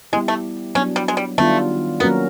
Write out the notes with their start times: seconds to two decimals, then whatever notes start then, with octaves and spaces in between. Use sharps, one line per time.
0.13 G3 G#3 B3 E4 G4
0.28 A3
0.75 F#3 B3 C#4 D4
0.96 G3
1.08 G#3
1.17 G3
1.38 D#3 G3 A3 B3 D4 F4
2.00 F#3 A#3 B3 C#4 F#4 A#4